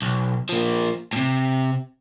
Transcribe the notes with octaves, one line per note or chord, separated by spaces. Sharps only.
B1
F3 A#3
A2 C3